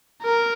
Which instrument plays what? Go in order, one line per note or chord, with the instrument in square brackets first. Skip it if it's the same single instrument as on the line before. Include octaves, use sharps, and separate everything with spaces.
[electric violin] A#4